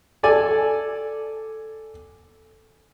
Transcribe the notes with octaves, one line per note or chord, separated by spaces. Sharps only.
A4 D5 G#5